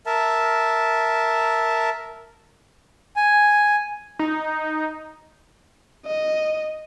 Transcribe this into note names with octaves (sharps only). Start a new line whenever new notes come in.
A#4 E5 A5
G#5
D#4
D#5